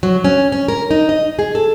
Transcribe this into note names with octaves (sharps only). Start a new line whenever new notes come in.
F#3
C#4
C#4
A#4
D#4
D#5
G#4
A4